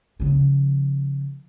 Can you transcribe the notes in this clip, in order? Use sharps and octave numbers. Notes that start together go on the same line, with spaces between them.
C#3 F3